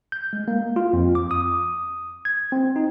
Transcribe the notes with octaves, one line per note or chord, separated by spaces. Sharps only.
G6
G#3
A#3
F4
F2
D6
D#6
G#6
C4
D#4